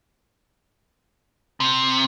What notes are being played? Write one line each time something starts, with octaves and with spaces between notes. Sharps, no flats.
C3